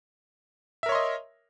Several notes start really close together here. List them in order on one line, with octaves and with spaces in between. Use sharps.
E5 A#4 C#5 C6 D#5